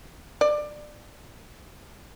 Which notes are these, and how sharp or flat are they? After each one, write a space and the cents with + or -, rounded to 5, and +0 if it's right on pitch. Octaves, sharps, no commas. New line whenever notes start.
D5 +20